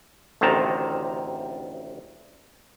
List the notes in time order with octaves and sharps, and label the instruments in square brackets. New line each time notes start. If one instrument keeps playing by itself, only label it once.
[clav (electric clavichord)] A1 D2 C3 D#3 A5 A#5